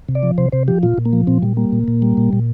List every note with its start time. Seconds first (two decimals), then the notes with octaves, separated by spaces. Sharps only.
0.09 C3
0.15 D5
0.23 F3
0.38 C3 C5
0.52 C3 C5
0.68 F3 G4
0.83 A#2 F4
0.98 A#2
1.05 A#3
1.13 F3
1.27 A#2 C4
1.42 A#2 G3
1.57 G3 A#3
1.73 A#2
1.88 A#2
2.02 G3
2.17 A#2
2.33 A#2